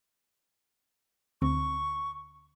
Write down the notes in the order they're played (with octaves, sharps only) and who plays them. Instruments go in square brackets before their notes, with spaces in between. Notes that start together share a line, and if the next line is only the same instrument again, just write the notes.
[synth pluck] D2 D3 C4 [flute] C#6